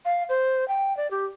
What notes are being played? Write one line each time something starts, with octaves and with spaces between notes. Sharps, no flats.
F5
C5
G5
D5
G4